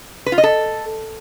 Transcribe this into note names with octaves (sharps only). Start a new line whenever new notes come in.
B4
F4
D#5
A4